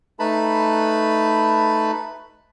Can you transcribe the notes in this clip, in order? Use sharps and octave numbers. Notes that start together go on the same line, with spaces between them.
A3 D#4 B4 A5 B5